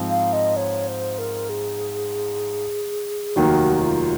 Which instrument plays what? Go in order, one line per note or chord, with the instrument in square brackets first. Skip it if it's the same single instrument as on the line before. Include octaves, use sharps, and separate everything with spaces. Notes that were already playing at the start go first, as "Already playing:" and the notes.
Already playing: [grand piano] G#2 F3 C4
[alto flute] F5
D#5
C#5
C5
A#4
G#4
[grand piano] F1 D#2 D#3 F#3 [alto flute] F#4
[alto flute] F4